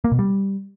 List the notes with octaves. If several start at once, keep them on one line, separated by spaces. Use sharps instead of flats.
A#3
B2
G3